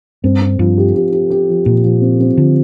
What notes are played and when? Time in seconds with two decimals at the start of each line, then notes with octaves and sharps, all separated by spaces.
0.24 G2 C4
0.42 C4
0.59 G2 F3
0.78 G4
0.95 G4
1.12 G4
1.30 G4
1.49 F3
1.66 A#2 F3
1.84 F3
2.01 C4
2.20 C4
2.37 D3 F3